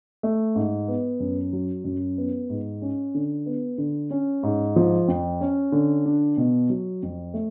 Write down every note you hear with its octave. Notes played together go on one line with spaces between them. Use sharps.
A3
G#2
B3
F#2
F#3
F#2
B3
G#2
C#4
D3
B3
D3
C#4
G#2
F3
F2
C#4
D3
D4
B2
F#3
F2
A3